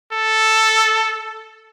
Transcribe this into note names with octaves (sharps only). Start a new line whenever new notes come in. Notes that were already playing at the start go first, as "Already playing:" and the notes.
A4